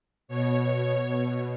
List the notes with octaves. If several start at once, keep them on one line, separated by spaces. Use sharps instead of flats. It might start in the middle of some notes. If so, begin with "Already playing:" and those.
B2 C#5
B2